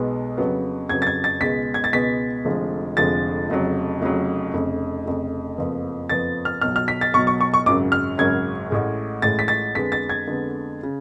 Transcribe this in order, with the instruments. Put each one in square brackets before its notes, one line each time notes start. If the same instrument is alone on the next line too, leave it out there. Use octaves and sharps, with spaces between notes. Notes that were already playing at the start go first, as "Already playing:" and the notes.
Already playing: [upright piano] B1 B2 G#3 B3
F2 C#3 F#3 B3
F2 C#3 F#3 B3 G#6
A6
G#6
A6
C#2 B2 G#3 B3 B6
G#6
A6
C#2 B2 G#3 B3 B6
F1 F2 D3 F3 G#3
F1 F2 D3 F3 G#3 A6
F1 F2 C#3 F#3
F1 F2 C#3 F#3
F1 F2 C#3
F1 F2 C#3
F#1 F2 F3 B3
F#1 F2 F3 B3 A6
F6
B1 B2 F#3 F6
F6
B6
A6
B1 B2 F#3 C#6
C#6
C#6
C#6
G#1 F#2 C#3 F#3 D6
F6
G#1 F#2 C#3 F#3 G#6
A1 A2 G#3
A1 A2 G#3 A6
B6
A6
F2 D3 G#3 B3 B6
A6
G#6
F2 D3 G#3 B3
C#3